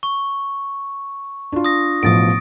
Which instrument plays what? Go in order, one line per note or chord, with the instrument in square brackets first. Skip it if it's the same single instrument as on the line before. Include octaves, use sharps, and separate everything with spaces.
[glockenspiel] C#6
[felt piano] D4 F4
[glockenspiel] D#6 A#6
[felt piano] A1 B2 F3 [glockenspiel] D#6 A6 D7